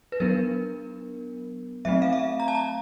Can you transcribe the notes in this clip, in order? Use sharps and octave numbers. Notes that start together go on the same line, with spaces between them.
B4
F#3 B3 D4 A#4
F#3 A3 C4 E5
F5
E5
A#5
A5
A#5